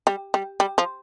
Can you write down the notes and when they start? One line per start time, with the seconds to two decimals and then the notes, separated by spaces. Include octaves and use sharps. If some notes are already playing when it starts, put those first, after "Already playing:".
0.07 G3
0.34 G3
0.60 G3
0.78 F3